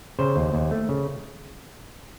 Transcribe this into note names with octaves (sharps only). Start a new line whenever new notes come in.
C#3 C5
D#2
D#2
A3
C#3